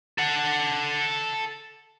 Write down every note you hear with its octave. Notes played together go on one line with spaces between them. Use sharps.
A4 F#5